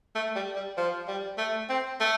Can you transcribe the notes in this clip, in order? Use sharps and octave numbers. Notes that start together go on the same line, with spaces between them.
A3
G3
G3
F3
G3
A3
C4
A3